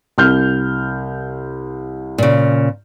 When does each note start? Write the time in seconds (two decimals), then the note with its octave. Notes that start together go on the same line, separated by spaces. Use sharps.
0.18 C2 F6 G6
2.18 A#2 C#3